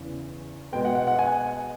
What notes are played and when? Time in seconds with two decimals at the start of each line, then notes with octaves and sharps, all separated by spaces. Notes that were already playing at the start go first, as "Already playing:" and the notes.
Already playing: E2 C#3 E3
0.72 B2 G#3 B3 G5
0.85 F#5
0.95 F#5
1.07 F#5
1.19 G#5